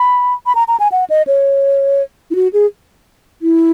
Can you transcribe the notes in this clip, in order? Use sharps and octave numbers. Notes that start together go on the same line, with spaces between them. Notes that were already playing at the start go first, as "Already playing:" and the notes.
Already playing: B5
B5
A#5
A#5
G#5
F#5
D#5
C#5
E4
F#4
G#4
E4